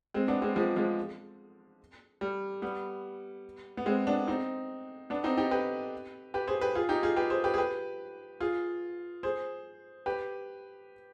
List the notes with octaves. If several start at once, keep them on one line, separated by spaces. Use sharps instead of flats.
G#3 C4
B3 D4
G#3 C4
F3 G#3
F3 G#3
G3
G3 B3
B3
G#3 C4
B3 D4
C4 D#4
B3 D4
C4 D#4
D#4 G4
G4 B4
G4 B4
G#4 C5
G4 B4
F4 G#4
D#4 G4
F4 G#4
G4 B4
G#4 C5
G4 B4
G#4
G4 B4
F4 G#4
G#4 C5
G4 B4